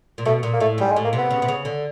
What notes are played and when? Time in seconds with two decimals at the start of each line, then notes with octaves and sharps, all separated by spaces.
0.18 A#2
0.25 B2 A3
0.43 A#2
0.53 A#3
0.60 A2 A3
0.78 G#2 G3
0.91 G#3
0.96 A2
1.04 A#3
1.13 C3
1.18 B3
1.31 C#3
1.42 C3
1.48 C#3
1.65 D3